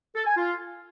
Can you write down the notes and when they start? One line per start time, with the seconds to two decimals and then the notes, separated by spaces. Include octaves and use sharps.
0.15 A4
0.26 G#5
0.36 F4